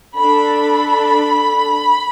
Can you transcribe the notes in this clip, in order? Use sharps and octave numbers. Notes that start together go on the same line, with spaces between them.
D4 A4 B5